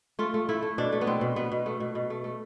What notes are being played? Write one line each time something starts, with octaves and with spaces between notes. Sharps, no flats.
A3 F4
A3
A3 E4
A3
B2 D4
A3
B3
B2 C4
B2
B2 B3
B2
A3
B2
B2
A3
A3